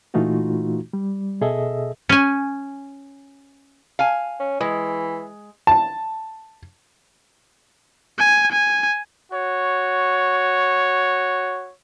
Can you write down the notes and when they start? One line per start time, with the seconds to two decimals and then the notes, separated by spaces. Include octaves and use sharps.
0.14 A#2 E3 A3 D#4 F4 F#4
0.93 G3
1.41 B2 G#4 A4 D#5 E5
2.09 C#4 G#5
3.99 F5 G#5
4.40 C#4
4.61 E3 G#3
5.67 A5
8.19 G#5
8.52 G#5
9.31 F#4 C#5